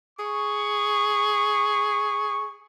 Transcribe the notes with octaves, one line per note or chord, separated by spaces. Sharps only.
G#4 C#6